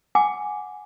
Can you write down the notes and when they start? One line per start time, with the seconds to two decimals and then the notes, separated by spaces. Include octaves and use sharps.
0.15 F#5 G#5 D6